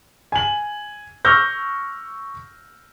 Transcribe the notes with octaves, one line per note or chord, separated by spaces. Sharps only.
G#5 F#7
C#6 D6 E6 F6 G6 A#6